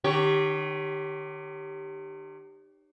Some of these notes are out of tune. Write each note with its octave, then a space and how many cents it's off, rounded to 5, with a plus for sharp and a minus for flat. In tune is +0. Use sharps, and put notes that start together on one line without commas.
D#3 -40 G4 +0 C#5 +0